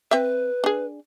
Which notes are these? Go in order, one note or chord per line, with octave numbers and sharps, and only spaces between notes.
C4 B4 E5
D4 G#4